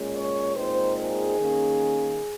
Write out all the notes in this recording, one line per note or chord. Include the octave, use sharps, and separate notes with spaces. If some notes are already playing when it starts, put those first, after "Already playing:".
Already playing: A#2 G#3 C#4
C#5
A#2 G#3 C4 D#4 C5
G#4
D#3 A#3 C#4